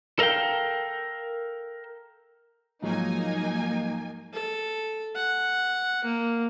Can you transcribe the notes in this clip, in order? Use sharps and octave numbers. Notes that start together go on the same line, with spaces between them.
A4 A#4 D#5 F5 G5
G#2 F3 F#3 A#3 D#4 G#5
A4
F#5
A#3